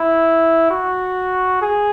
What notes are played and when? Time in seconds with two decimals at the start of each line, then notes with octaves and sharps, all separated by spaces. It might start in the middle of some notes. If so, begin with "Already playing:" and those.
Already playing: E4
0.71 F#4
1.62 G#4